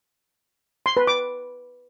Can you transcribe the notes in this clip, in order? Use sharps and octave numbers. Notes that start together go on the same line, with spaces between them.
C6
B4
D6